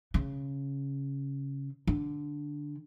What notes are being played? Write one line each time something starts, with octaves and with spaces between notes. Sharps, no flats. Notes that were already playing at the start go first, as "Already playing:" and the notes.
C#3
D3